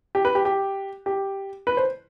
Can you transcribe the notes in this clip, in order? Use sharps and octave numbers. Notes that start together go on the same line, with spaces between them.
G4
B4
G4
G4
G4
B4
C5